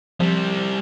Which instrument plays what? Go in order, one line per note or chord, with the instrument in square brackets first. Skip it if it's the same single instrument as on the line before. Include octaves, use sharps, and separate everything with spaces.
[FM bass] F3 [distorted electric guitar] G3 C4